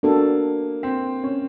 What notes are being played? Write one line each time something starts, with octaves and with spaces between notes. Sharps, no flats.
A#3 B3 D4 F#4 A4
C4
C#4